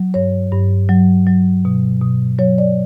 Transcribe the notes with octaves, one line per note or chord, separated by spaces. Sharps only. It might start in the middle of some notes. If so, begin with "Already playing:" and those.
Already playing: F#3
G2 C#5
G2
F#3
F#3
B2
B2
F#3 C#5
D5